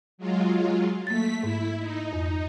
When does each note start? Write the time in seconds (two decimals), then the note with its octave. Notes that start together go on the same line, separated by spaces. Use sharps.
0.18 F#3 G#3 F4
1.07 A3 A#3 A6 B6
1.43 G#2 E4
1.79 D#4
2.13 F2